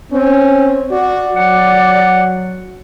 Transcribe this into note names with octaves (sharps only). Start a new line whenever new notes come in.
C4 C#4
F#4 D5
F#3 F#5